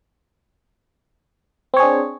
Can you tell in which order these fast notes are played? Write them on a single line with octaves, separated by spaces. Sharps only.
C4 C#5 G#4 D4